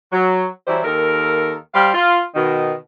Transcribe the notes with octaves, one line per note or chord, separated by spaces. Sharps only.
F#3
E3 F#3 G3 E4 C5
D#2 D#3 A4 A#4
G3 C5 F5
F4
B2 D#3